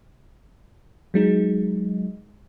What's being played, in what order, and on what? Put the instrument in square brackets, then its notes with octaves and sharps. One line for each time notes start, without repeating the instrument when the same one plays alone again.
[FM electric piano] F#3 G#3 D#4